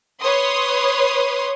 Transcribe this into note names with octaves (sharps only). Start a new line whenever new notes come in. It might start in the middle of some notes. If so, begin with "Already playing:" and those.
B4 C#5 C6 D#6